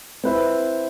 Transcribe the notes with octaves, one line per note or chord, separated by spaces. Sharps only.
C4 E4 B4 E5